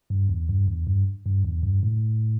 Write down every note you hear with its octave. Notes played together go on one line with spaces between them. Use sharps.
G2
E2
G2
E2
G2
G2
E2
G2
A2